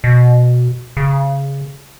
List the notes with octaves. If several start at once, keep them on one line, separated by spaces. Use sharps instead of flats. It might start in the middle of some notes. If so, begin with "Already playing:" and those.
B2
C#3